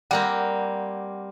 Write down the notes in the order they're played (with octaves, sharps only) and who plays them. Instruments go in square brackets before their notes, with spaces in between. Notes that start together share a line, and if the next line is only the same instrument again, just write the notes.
[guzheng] G3 A#3 C4 [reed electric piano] F#5